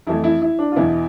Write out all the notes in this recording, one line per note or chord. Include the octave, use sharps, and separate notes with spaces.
F2 E3 A3 E4
E4
E4
D4
F4
E2 B2 B3 E4